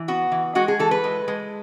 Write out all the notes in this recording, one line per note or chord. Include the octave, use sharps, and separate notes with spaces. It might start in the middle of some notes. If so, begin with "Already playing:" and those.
Already playing: E3
B3 F#4
E3
G#3 F#4
G#4
E3 A4
B4
G#3
G#3